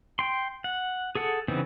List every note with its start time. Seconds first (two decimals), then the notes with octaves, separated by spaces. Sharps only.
0.19 G5 C6
0.64 F#5
1.15 G#4 A4 F#5
1.48 C#3 E3 B3 C4 D#4